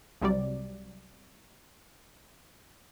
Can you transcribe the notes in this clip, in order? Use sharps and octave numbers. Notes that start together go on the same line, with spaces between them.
C2 C3 F#3 G3 D5